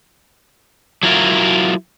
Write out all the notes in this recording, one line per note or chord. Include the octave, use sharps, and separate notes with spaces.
F#3 E4 F4 A#4